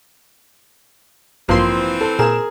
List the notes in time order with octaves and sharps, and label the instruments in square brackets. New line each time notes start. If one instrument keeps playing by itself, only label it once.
[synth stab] A1 G2 C6 [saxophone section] E3 C4 [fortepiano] F3 A#3
[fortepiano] A4
[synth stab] A#2 E7 [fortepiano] G#4 A#4